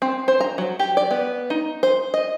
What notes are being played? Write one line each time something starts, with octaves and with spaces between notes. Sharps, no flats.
C4
C5
A#5
F#3
G4
D5
B3
D#4
C5
D#5